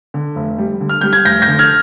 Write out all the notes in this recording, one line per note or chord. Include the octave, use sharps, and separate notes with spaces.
D3
F1
G3
D3
F6
G3 G6
G#6
F1 G6 A#6
G6 A#6
D3
F6 G#6